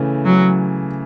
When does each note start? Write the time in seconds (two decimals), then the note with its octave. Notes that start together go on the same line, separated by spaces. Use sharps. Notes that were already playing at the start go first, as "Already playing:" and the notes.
Already playing: C#3 E3 A3
0.25 F#3